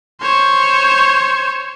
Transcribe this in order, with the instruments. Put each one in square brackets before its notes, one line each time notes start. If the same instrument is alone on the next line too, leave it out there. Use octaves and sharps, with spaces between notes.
[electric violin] C5 C#5